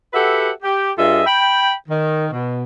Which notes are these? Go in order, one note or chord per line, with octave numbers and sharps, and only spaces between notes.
F#4 G4 A4 B4 E5 F#5
G4
G2 F4 G#4 A4 D#5 E5
G5 B5
D#3
B2